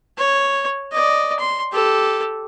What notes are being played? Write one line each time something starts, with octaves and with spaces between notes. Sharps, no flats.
C#5
D5 D#5
C6
G4 A4